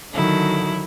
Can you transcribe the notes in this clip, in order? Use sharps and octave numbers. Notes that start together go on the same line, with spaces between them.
D3 D#3 F#3 E4